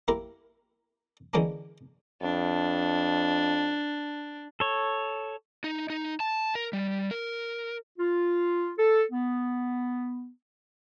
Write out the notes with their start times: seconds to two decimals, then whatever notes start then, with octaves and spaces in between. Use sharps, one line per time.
0.08 A#3 E4 G4 A#4
1.33 D3 E3 G#3 A#3 C#4 D4
2.22 F2 D4
4.60 A4 C#5
5.64 D#4
5.90 D#4
6.20 A5
6.55 A#4
6.73 G3
7.11 A#4
7.99 F4
8.78 A4
9.11 B3